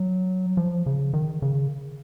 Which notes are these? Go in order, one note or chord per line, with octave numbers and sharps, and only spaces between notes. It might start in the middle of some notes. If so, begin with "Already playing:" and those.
Already playing: F#3
F3
C#3
D#3
C#3